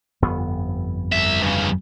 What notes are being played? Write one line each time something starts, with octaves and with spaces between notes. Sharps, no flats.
G1 F2 B3
C2 E5
G2 C#3